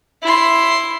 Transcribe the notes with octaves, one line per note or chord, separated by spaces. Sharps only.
E4 C6